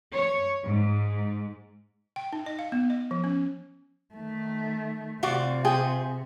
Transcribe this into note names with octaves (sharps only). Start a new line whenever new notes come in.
C#5
G#2
G5
D#4
D#5
F5
B3
D#5
F3
C#4
D#3 A3
C3 F4 F#4 D5
F4 G#4 G5